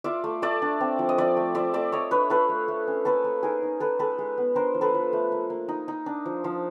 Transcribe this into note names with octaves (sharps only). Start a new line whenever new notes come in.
F4 D5 E5
A3
A3 D5 E5
D4
C4
F3
D#5
F3 D5 E5
A3
F4 D5 E5
A3 D5 E5
A3 C#5 D#5
D4 B4 C#5
F4 A4 B4
A3
A3
C#4
A#3 A4 B4
A#3
D#4 G#4 A#4
D#4
D#4 A4 B4
G#3 A4 B4
G#3
B3
D4 A#4 C5
F3
A4 B4
F3
A3
A#3
A#3
D#4
D#4
D4
F3
F3